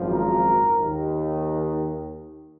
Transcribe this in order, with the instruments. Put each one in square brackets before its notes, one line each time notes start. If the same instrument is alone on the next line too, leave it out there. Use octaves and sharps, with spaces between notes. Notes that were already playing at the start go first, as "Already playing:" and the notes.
Already playing: [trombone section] G#1 F#2 F3
A#4
D#2 D#3